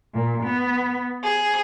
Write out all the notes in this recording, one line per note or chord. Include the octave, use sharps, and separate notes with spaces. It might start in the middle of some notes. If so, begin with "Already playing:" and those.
A#2
B3
G#4